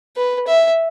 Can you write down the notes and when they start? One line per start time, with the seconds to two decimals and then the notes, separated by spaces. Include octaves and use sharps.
0.16 B4
0.47 E5